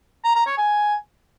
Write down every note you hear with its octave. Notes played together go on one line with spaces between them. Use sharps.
A#5
A#5
C#5
G#5